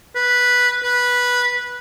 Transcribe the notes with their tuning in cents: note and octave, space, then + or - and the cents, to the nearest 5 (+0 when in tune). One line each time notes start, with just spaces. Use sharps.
B4 -5
B4 -10